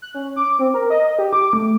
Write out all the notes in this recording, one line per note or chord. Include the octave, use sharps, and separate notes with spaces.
F#6
C#4
D6
C4
A#4
D#5
D#5
G4
D6
A3